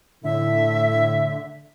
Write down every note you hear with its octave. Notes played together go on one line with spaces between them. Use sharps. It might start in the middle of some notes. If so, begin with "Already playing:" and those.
A2 D3 E5